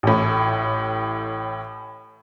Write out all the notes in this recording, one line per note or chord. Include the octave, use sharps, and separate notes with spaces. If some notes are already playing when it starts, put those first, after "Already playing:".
A1 A2